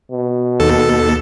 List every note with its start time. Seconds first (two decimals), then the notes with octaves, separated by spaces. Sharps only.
0.12 B2
0.60 D#2 A4